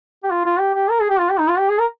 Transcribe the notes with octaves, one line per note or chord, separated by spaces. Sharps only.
G4
F4
F4
G4
G4
A#4
G#4
G4
F4
G4
D#4
F4
G4
G#4
A#4